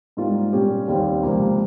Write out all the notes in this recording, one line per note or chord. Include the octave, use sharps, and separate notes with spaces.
G#2 G3 A#3 F4
A#2 G3 C#4 G4
D#2 D#3 G3 C4
C#2 C3 F3 A#3